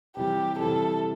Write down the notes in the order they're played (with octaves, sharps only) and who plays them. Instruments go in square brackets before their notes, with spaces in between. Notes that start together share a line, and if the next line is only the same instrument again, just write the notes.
[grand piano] C3 E3 G3 [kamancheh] G4
[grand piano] C3 E3 G3 [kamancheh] A4